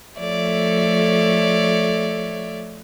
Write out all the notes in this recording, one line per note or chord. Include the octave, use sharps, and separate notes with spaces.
F3 A3 A4 C#5 D5 E5